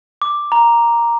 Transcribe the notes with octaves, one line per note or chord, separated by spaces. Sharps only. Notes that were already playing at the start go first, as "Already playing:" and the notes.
D6
A#5